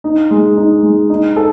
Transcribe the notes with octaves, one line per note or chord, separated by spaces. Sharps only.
D#4
G#3
D#4
G#3
D#4
A4